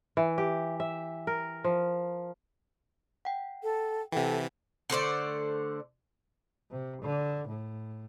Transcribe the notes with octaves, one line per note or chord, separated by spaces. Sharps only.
E3
G4
E5
A#4
F3
F#5 G5
A4
C3 E3 A4 F#5 G5
D3 A3 C5 D5
C3
D3
A2